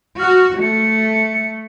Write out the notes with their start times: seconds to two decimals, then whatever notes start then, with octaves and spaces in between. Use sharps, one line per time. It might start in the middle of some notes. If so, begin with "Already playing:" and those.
0.20 F#4 F6
0.61 A3 C#7